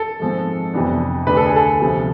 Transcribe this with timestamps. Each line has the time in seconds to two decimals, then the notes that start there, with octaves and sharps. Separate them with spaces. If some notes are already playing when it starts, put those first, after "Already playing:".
Already playing: A4
0.20 G#2 F3 G#3 C4
0.74 F2 C3 E3 B3 D4
1.27 D2 D3 A3 D4 B4
1.37 A4
1.46 G#4
1.56 A4
1.80 D2 C3 F3